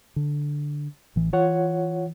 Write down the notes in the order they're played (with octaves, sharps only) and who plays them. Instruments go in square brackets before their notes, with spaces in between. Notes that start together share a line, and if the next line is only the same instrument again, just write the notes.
[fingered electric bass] D3
A1 E3
[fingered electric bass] E3 [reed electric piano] F4 C#5 F#5